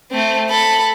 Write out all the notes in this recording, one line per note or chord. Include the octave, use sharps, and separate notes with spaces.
A3 C4
A4 B5